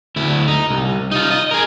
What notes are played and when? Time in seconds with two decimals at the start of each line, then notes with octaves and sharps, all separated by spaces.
0.16 D2 E4
0.48 D#4
0.70 C2
1.11 D#4 F4
1.31 D#5
1.51 G#4 A#4